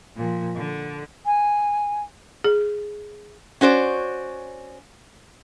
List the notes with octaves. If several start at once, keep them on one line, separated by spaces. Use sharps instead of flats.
A#2 F3
D3
G#5
G#4
C#4 F#4 C5 D5